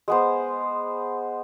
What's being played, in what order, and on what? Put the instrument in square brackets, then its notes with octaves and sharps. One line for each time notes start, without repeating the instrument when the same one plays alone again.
[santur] G#3 B3 C5